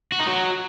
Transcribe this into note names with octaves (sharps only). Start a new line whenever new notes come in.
F#4
D#4
F#3